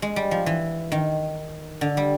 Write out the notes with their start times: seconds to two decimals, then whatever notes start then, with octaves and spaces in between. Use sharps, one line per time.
0.02 G#3
0.16 G3
0.31 F3
0.46 E3
0.92 D#3
1.81 D3
1.97 G3